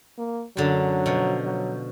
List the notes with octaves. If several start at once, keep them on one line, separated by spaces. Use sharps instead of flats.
A#3
F#2 D3 F#3 D4
B2 F3
F#3